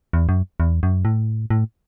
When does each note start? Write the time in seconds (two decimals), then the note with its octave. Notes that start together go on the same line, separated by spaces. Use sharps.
0.13 E2
0.29 F#2
0.60 E2
0.83 F#2
1.05 A2
1.50 A2